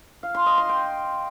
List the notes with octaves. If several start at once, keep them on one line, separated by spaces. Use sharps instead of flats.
F5
C6
D#5
C6
G5